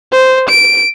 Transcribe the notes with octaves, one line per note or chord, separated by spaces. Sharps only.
C5
D7